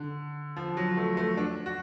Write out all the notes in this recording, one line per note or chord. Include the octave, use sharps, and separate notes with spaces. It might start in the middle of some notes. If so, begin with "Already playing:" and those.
Already playing: D3
F3
F#3
A3
A3
D4
F#4